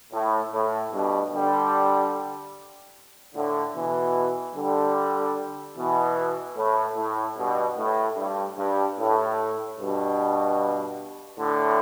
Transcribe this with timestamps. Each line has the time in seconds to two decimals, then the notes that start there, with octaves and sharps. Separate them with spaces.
0.12 A2
0.52 A2
0.92 G2 B2
1.34 D3 G3
3.34 A2 D3
3.75 B2 E3
4.55 D3 G3
5.76 B2 E3
6.56 A2
6.96 A2
7.37 G2 B2
7.77 A2
8.17 G2
8.57 G2
8.98 A2
9.78 G2 B2
11.39 A2 D3